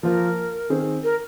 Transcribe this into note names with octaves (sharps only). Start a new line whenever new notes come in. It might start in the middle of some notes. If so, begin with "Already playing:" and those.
F3 A#3 F4 A#4 C5
D#3 C4 G#4 C5
A#4